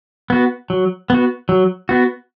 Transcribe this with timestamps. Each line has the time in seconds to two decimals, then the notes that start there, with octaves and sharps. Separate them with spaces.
0.30 B3 F#4
0.70 F#3
1.10 B3 F#4
1.49 F#3
1.89 B3 F#4